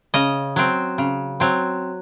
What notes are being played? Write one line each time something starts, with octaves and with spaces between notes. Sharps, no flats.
C#3 D#5
F#3 C4
C#3
F#3 C4